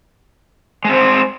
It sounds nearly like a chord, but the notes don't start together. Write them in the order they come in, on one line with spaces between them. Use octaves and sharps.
G#3 C4 C5